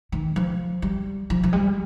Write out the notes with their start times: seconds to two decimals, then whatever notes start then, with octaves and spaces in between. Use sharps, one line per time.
0.12 D#3
0.36 F3
0.82 G3
1.30 F3
1.43 F3
1.53 G3